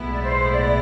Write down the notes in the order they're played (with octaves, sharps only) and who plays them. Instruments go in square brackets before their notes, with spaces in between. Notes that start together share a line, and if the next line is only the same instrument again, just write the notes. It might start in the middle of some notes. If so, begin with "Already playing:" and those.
Already playing: [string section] B1 A2 G#3 B3 E4
[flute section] D5
C5
D5
D5